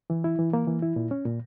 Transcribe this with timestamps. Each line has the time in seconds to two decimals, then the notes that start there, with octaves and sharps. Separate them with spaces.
0.10 E3
0.24 E4
0.39 E3
0.53 A#3
0.67 E3
0.82 E4
0.96 A#2
1.11 C#4
1.25 A#2